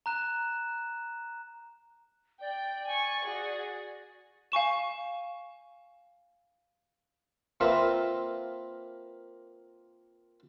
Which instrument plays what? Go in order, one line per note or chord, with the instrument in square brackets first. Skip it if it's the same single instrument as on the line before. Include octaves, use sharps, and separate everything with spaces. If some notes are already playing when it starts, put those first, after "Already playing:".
[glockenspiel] A#5 F#6 E7
[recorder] D5 [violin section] G5
[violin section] G#5 C#6
F#4 G#4
[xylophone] F5 G#5 C#6 E7
[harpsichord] A#3 C4 F4 A#4 B4 E5